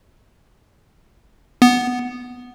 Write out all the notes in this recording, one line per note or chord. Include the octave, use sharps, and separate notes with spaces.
B3